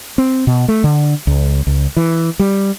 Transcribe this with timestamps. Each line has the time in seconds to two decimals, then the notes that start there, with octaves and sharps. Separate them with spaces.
0.18 C4
0.47 B2
0.68 A3
0.84 D3
1.27 C#2
1.67 C#2
1.97 E3
2.39 G3